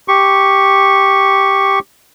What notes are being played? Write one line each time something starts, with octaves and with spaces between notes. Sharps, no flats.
G4 C#6